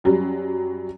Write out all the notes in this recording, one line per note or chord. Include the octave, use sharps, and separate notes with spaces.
F#2 F#3 G3